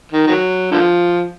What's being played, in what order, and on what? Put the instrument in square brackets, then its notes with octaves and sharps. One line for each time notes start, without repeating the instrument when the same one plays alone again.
[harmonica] D#3
D#3 F#3
D3 F3